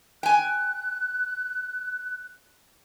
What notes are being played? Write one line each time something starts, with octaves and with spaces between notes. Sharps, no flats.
G5 G#5 F#6